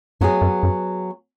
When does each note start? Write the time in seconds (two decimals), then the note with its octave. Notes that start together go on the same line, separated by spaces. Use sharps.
0.21 F#2 F#3 B3 G#4
0.42 F#2
0.63 F#2